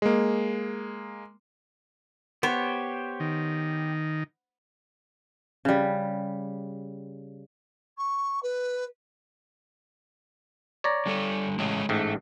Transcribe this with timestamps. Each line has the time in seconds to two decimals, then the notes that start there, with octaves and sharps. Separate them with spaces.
0.02 G#3 A#3
2.43 B3 G4 C5 C#5
3.20 D#3
5.65 C#3 G3
7.97 C#6
8.42 B4
10.84 C#5 D5 A#5
11.06 D3 G3 A4
11.59 A1 G#3 A3 C#5
11.89 A1 G#2 A3